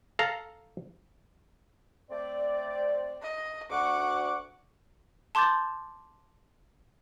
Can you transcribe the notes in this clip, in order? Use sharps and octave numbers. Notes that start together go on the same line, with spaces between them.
A4 F5 A#5
A3 C4 D5
D#5
D2 F#5 C#6 D6
A5 C6 D6 G6 A6